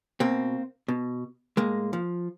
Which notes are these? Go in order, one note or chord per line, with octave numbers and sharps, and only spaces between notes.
B2 A#3 C4
B2
A2 G#3 A#3
F3